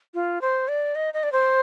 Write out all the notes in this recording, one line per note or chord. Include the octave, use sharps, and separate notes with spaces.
F4
C5
D5
D#5
D#5
D5
C5